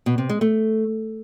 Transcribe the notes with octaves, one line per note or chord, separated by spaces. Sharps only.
B2
C3
G#3
A3